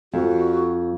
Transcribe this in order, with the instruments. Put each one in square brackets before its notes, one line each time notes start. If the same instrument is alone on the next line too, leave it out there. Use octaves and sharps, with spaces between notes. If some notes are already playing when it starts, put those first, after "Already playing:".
[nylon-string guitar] F2 [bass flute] F#4